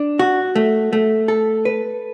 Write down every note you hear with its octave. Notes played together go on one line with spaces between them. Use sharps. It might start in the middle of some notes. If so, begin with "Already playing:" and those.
Already playing: D4
F#4
A3
A3
A4
B4